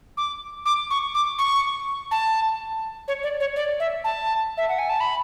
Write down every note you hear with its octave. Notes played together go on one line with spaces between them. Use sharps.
D6
D6
C#6
D6
C#6
A5
C#5
D5
C#5
D5
E5
A5
E5
F#5
G#5
A5
B5